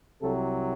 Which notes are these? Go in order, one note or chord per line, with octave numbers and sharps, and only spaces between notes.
C2 C3 F#3 A4